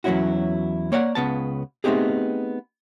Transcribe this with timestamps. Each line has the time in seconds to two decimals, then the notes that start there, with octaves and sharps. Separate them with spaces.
0.04 E2 F#3 C4 C#4 E4 F#4
0.92 A#3 C#5 D5 E5 F#5
1.15 C#2 C#3 B3 A5
1.84 A3 B3 C4 D#4 G4 G#4